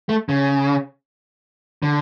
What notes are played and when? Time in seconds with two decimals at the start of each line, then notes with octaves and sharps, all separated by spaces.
0.09 A3
0.29 C#3
1.83 D3